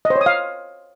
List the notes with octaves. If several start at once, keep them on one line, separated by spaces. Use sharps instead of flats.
D#5
C5
C#5
D#6
F5